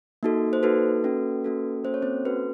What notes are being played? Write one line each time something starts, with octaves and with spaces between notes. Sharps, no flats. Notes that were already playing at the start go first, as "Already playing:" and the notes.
A#3 D#4 F#4 A4
C5
A#3 D#4 F#4 A4 B4
A#3 C#4 F#4 A4
A#3 C#4 F#4 A4
A#3 C#4 F#4 A4 C5
C#5
C4 C5
A#3 C#4 F#4 A4 B4